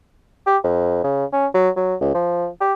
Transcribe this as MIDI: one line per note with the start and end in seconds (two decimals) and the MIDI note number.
0.47 0.57 67
0.64 1.01 41
1.04 1.25 49
1.33 1.46 61
1.55 1.69 54
1.76 1.95 54
2.01 2.10 37
2.15 2.47 53
2.61 2.73 67